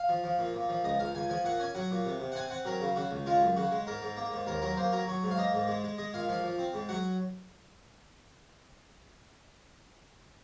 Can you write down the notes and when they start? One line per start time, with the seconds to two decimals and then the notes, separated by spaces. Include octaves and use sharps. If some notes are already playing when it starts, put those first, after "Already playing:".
Already playing: F5
0.09 F3
0.24 F3
0.39 A#2
0.55 A#2
0.69 F3
0.84 C#2 D#5
0.99 C#2 F5
1.15 C#2 G#5
1.29 F3 G#5
1.44 A#2 F#5
1.60 C#4 G#5
1.75 F#3 F#5
1.91 A#2
2.05 C3
2.20 C3
2.32 F#5
2.35 C4 G#5
2.50 C4 F#5
2.65 F#3 A#4
2.80 C#3
2.96 C#3 F#4
3.11 C#2
3.26 G#3 F4
3.41 F#2
3.56 C#3 F#4
3.72 G#3
3.87 G#2 A#4
4.01 G#2
4.17 A#3
4.32 G#2
4.47 D#2 A#4
4.62 F#3 A#4
4.77 A#3 C5
4.92 F#3 A#4
5.07 F#3 C#5
5.23 G#2
5.31 F5
5.37 A#3 D#5
5.53 G#2
5.68 G#3
5.84 G#3
5.98 G#3 D#5
6.14 A#2 F5
6.29 F3 F5
6.44 F3
6.59 C4
6.74 G#2
6.89 F#3 F#5